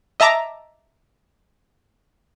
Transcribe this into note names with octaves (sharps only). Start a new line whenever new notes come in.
D#5 E5 A5 A#5 D6